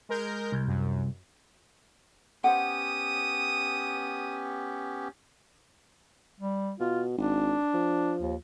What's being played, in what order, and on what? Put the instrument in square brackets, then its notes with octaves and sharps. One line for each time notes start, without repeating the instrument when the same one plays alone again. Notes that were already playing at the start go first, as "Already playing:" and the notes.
[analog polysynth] G#3 A#4 G6
[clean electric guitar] C2
[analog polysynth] F#2
[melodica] B3 C#4 G4 [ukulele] C5 F#5 [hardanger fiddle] D#6
[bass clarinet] G3
[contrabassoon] B2 [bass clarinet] F4
[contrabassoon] G#1 [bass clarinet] D4
[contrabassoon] F3
[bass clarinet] D#2